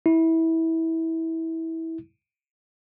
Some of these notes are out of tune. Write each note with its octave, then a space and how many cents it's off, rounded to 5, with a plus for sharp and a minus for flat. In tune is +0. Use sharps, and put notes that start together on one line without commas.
E4 -20